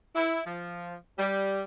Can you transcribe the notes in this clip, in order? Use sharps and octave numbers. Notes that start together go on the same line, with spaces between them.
E4
F3
G3